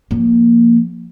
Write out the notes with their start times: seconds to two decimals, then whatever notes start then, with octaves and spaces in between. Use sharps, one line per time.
0.11 F3 A#3